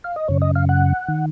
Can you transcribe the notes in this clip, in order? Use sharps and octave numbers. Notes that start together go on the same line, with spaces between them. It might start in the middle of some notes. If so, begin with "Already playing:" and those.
F5
D#5
F#2 C#3 C#5
D#5
F5
F#5
D#3